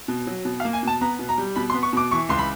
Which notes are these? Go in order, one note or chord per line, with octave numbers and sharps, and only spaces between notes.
B2
F#3
B2
F5
A#3
G#5
B2 A5
B3 A#5
B2
A#5
G3
B2 B5
C6
B3
C#6
B2 D6
E3 C#6
C#2 C6
B5